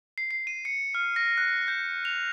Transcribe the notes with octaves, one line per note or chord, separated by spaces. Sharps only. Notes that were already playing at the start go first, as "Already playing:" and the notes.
C7
C7
D#7
C#7
F6
A#6
F#6
G6
F7